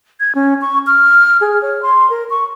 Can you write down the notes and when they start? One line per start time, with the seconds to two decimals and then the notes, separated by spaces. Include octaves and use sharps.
0.20 G#6
0.35 C#4
0.61 C#6
0.87 F6
1.41 G#4
1.62 C#5
1.82 C6
2.10 A#4
2.30 C#6